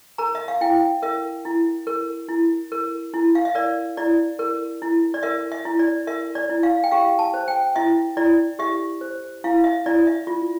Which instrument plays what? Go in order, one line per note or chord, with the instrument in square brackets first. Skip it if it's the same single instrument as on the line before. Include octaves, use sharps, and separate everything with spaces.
[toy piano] A#4 A#5
E5
F5
E4 G5
A#4 E5
E4
A#4
E4
A#4
E4
F5
E5
A#4 D5
E4 D5
A#4
E4
D5
A#4 E5
E5
E4
D5
A#4 E5
D5
E4
F5
G5
G4 F5
A5
C5
G5
E4 E5
E4 D5
G4 E5
C5
E4 F5
E5
E4 D5
E5
F4